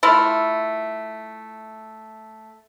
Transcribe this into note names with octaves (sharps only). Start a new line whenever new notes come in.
A3 E4 F4